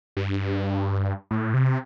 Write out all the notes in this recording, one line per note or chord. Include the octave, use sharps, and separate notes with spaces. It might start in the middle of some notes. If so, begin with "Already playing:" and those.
G2
A2
C3